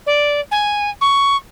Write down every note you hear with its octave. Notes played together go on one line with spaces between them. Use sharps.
D5
G#5
C#6